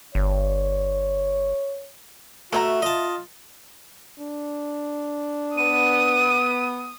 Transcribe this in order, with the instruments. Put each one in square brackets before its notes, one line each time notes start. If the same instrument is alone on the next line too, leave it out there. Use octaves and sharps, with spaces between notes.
[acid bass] G1 [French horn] C#5
[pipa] B2 E5 A#5 [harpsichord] A3 [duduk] F#4
[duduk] F4 [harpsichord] D#5 A5
[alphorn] D4
[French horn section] B3 [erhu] D#6 [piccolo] D#7